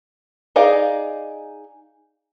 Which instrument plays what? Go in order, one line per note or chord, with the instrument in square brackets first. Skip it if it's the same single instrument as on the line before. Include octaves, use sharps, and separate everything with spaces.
[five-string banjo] D#4 G#4 D5 D#5 F5